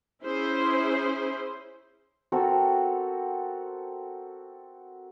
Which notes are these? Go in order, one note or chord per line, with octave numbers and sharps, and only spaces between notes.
C#4 E4 G#4 C5
C4 F#4 A4 A#4